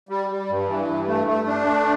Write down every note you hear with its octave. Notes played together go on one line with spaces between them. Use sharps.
G3
G3
G2
E3
G2
A3
A3
D4
A3